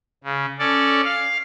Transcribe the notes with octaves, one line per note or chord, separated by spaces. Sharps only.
C#3
C#4 A4 D5
F5